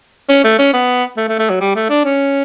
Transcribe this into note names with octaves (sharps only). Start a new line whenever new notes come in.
C#4
A3
C#4
B3
A3
A3
A3
F#3
G3
A3
D4
C#4